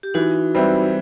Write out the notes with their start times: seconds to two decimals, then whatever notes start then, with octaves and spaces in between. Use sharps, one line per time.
0.03 G4
0.14 E3 D#4 F#4
0.55 G3 C4 E4 B4